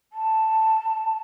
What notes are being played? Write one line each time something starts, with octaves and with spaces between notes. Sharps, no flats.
A5